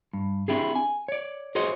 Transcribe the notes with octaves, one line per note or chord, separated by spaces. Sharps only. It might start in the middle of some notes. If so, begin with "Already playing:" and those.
G2
C4 D4 E4 G4 G#4
G#5
C#5 D5
F#4 G#4 C5 C#5 D#5